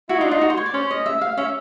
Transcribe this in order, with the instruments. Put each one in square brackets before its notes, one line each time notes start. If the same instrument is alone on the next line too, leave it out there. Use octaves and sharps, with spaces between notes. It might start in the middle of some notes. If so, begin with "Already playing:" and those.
[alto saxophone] E4 [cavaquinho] F#4
[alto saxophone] D#4
[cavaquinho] F4
[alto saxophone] D4
[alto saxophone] D#4 [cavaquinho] F4
[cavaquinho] F#4
C5
C#5
D5
[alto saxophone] C#4 [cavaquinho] C5
[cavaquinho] D#5
E5
F5
[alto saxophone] C#4 [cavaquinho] E5